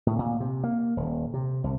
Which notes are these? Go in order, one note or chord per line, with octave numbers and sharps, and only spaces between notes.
A2
A#2
C3
A#3
D#1
C3
C2